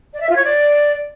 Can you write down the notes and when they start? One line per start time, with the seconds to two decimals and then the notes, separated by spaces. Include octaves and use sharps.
0.13 D5
0.21 E5
0.29 F4
0.36 C#5
0.44 D5